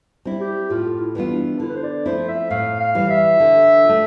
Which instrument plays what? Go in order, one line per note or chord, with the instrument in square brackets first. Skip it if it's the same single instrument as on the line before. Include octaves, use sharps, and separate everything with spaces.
[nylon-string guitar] G3 C4 E4
[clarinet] G4
[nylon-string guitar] A2 [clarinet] F4
[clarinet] E4
[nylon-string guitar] E3 G3 B3 F4
[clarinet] D4
[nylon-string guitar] D3 [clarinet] E4
[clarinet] B4
C5
D5
[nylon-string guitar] F3 A3 C4 E4 [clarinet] C5
[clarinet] E5
[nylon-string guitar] A2 [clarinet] F5
[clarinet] F5
[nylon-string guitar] E3 G3
[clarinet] E5
[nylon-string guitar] D3
A3 D4 F4